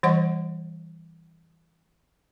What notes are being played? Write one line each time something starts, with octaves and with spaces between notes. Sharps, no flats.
E3 G3 C5 D#5 F#5 C#6